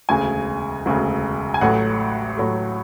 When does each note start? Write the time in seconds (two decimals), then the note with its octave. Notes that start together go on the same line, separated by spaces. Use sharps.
0.09 E1 D2 C#3 G#5
0.86 E1 D2 C#3
1.54 G#5
1.61 A1 A2 F#3 A3 F#5
2.37 A1 A2 F#3 A3